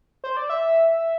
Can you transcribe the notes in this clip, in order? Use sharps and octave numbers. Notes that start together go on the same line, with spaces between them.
C5
D5
E5